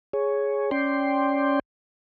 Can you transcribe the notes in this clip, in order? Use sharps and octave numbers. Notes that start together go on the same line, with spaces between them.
G#4 C#5
C#4 D5 G5 C6